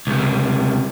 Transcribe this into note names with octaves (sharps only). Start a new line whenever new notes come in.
C#2 C3